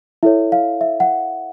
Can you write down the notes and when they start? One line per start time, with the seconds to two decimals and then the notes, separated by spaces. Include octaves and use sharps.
0.23 E4 A4 C#5 E5
0.52 F5
0.81 E5
1.00 F#5